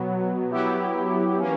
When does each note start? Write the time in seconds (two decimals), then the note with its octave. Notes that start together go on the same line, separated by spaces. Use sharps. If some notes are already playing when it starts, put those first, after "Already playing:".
Already playing: B2 F#3 B3
0.50 F#3 B3 E4 G4
1.38 E3 A#3 C#4